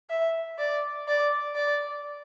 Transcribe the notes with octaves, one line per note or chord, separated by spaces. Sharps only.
E5
D5
D5
D5